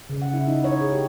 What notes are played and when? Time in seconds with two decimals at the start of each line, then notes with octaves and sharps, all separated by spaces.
0.10 C#3
0.22 F#5
0.34 E4
0.48 D#4
0.64 C#5
0.81 G#4
0.93 G4